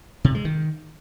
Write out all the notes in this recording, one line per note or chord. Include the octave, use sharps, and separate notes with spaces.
C3
G#3
D#3